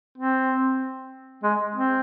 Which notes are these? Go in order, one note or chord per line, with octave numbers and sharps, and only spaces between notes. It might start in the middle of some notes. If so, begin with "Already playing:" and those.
C4
G#3
C4